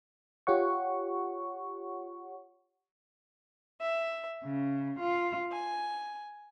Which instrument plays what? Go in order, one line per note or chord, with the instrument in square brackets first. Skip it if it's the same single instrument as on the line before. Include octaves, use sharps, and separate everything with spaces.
[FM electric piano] F4 G4 C#5 F#5 C#6
[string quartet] E5
C#3
F4
G#5